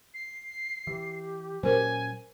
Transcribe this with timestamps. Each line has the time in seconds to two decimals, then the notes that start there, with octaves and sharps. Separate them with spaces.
0.14 C7
0.87 E3 G4
1.63 A#2 F#3 C#4 A#4 C5 G#5